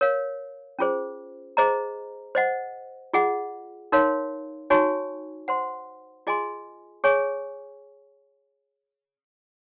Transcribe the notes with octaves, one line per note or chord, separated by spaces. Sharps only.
A#4 C#5 F5
C#4 F4 G#4 C5
G#4 C5 D#5 A#5
C5 D#5 F#5
F4 G#4 D#5 F#5
D#4 A#4 C#5 F5 C6
D#4 F#4 C#5 G#5 C#6
C5 F#5 C6
F4 G#4 D#5 G#5 C6
G#4 C#5 G#5 C#6